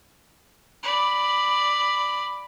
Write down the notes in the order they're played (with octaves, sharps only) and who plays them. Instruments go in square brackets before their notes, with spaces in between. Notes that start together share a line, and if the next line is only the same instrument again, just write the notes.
[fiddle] D5 B5